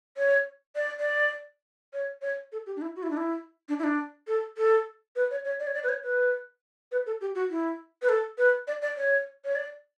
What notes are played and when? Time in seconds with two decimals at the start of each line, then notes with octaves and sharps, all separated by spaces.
0.17 C#5
0.75 D5
0.99 D5
1.93 C#5
2.22 C#5
2.52 A4
2.66 G4
2.76 D4
2.81 E4
2.96 F#4
3.03 E4
3.10 D4
3.17 E4
3.69 D4
3.79 E4
3.83 D4
4.27 A4
4.57 A4
5.16 B4
5.31 C#5
5.44 C#5
5.59 D5
5.67 C#5
5.74 D5
5.83 B4
5.89 C#5
6.03 B4
6.92 B4
7.06 A4
7.21 G4
7.35 F#4
7.50 E4
8.02 B4
8.09 A4
8.38 B4
8.67 D5
8.82 D5
8.97 C#5
9.44 C#5
9.55 D5